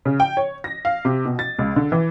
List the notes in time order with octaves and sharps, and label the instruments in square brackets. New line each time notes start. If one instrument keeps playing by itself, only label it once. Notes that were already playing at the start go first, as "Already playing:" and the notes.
[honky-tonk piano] C#3
G5
C#5
A#6
F5
C3
B2
A6
C#2
D3
E3